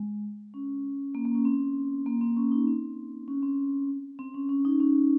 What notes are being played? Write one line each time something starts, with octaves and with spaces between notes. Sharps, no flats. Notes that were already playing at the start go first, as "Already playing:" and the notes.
Already playing: G#3
C#4
A#3
A#3
C#4
C4
A#3
C4
C#4
D#4
C4
C#4
C4
C4
C#4
C#4
D#4
C#4